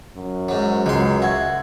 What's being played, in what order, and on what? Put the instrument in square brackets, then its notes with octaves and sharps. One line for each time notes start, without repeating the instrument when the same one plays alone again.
[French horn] F#2
[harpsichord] G#2 F#3
[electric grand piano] C#2 [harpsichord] G#3 C6
[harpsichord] F#4 [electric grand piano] E5 G#6